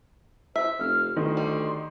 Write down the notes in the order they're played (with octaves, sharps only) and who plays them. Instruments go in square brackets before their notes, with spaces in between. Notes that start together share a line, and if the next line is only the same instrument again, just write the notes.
[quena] C5 [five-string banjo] E5
[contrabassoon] F1 [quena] F6
[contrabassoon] D2 [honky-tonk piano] D#3 D#5 [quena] C6
[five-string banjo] G3